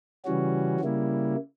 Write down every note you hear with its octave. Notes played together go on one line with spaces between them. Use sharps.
C#3 E3 G3 C#4 F#4
C#3 G3 A#3 E4